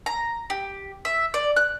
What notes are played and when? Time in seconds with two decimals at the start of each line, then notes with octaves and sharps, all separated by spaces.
0.06 A#5
0.50 G4
1.05 E5
1.34 D5
1.56 F#6